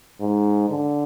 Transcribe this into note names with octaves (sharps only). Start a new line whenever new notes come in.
G#2
D3